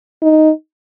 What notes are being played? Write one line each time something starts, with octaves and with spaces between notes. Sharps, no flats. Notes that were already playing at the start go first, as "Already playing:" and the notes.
D#4